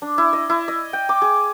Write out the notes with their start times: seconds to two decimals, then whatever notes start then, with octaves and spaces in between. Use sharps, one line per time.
0.02 D4
0.18 E4
0.33 D#5
0.49 E4
0.68 D#5
0.93 G5
1.09 D6
1.22 G#4